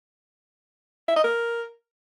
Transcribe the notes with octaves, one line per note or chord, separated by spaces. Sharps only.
E5
D#5
A#4